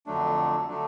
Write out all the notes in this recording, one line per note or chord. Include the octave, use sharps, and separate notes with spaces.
F2 D3 F#3 A3 D4
D3 F#3 A3 D4